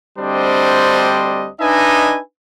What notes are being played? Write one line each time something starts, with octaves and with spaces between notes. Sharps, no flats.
D2 G3 C4 D4 C5 D#5
D4 D#4 B4 D#5 E5 G#5